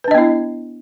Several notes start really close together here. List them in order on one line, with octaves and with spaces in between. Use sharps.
B4 D4 D#5 B3 E4